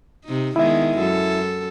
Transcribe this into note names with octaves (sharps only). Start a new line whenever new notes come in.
C3 D#4
D#3 G#3 B3 E4 E5
F#2 A4